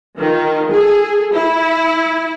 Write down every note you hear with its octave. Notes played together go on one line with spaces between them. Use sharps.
D#3 F4
G#4 A4
E4